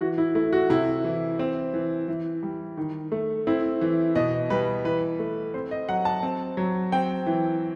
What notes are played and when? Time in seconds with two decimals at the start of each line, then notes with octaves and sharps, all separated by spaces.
0.01 E3 F#4
0.18 E4
0.35 A3 E4
0.53 F#4
0.70 C3 E4
1.04 E3
1.39 C4
1.74 E3
2.08 E3
2.43 G3
2.77 D#3
3.12 A3
3.47 C4 E4
3.81 E3
4.15 B2 D#5
4.50 G3 B4
4.85 E3 B4
5.19 A3
5.54 C4 C5
5.71 D#5
5.89 F#3 F#5
6.05 A5
6.23 C4
6.57 F#3
6.92 C4 G5
7.27 E3